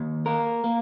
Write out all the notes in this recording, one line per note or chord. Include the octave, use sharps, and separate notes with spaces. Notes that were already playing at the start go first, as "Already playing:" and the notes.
Already playing: D#2
A#3 A#4
A#3